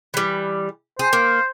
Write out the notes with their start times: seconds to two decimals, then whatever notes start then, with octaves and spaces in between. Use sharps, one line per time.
0.14 E3 G3
0.99 G#4 C5
1.13 A#3